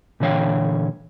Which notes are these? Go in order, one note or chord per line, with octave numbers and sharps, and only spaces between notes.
A#2 D3 E3 C#5 F5 G5